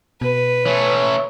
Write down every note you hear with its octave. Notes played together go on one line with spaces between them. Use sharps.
B2 B4
E3 A3 C#5